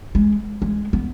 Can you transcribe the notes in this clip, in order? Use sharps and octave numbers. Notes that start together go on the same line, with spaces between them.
G#3
G#3
B3